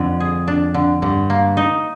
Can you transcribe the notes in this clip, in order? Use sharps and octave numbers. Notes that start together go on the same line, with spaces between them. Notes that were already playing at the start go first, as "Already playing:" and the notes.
Already playing: F2 D3
G#4
D4
D3
G2 D3
A#3
D#4